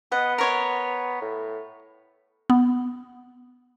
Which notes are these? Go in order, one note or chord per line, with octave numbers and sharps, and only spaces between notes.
B3 D#5 F#5
A#4 C#5 C6
A2
B3